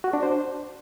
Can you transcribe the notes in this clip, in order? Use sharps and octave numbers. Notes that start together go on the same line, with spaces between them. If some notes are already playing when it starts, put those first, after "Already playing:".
F#4
D4
C5